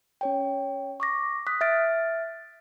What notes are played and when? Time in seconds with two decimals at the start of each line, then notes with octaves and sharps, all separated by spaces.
0.21 C#4 C#5 G5
1.00 C#6 D6 A#6
1.47 D#6 F#6 B6
1.61 E5 F6 A6 D7